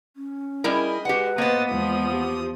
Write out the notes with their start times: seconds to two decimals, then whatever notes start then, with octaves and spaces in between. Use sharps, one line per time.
0.17 C#4
0.64 G3 E4 G#4 A#4 D#5
1.05 G#3 F#4 G4 B4 F#5
1.38 A#3 B3 C5 D#5 A6
1.69 E2 F3 G#3 D#6
2.10 G4